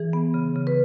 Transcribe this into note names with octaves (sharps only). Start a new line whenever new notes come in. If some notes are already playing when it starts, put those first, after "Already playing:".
Already playing: E3 G#4
B3
C#3
C#3
B4